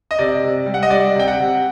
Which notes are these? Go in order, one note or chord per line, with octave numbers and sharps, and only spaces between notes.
D#5
C3 D5
C3
G3
F#5
D#5
G3 D5
C3 G5
F#5
C3